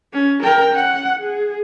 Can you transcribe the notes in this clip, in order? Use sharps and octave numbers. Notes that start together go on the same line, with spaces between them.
C#4
A#4 G5
C#4 F#5
G#4